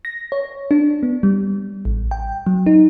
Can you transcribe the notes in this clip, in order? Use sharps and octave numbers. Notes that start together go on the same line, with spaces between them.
A#6
C#5
D4
B3
G3
A1
G5
F#3
D#4